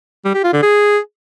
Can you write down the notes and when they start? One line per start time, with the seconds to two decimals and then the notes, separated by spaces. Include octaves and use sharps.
0.25 G3
0.34 G4
0.44 F4
0.53 D3
0.62 G#4